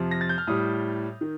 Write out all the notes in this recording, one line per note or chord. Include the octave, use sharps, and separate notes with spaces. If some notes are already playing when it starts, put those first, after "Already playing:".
Already playing: F2 C3 F3
A#6
A6
G6
F6
A2 G3 D#6
D#3